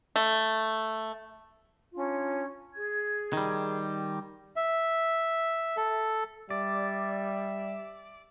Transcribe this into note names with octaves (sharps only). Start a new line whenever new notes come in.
A3
C#4 D4 F4
G#4 G#6
D#3 G3
E5
A4
G3 D5 E5